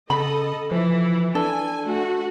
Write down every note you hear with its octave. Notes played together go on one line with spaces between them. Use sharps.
C#3 A4 D#5 B5
E3 F3
D4 A4 G#5
A3 F#4